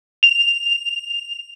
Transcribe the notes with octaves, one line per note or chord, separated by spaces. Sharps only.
F7